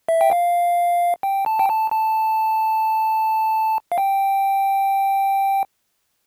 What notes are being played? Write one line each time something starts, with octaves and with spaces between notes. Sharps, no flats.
E5
G5
F5
G5
A5
G5
A5
A5
F5
G5